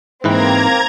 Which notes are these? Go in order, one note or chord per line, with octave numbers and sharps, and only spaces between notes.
G#2 E3 A#3 C4 B4 A#5 G#6